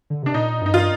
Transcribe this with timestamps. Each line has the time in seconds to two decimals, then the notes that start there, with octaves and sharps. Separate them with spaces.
0.10 D3
0.23 C3 D4
0.34 A#2 D#4
0.61 G2 D#4
0.74 F4